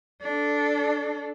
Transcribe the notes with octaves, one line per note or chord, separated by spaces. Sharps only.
D4 A4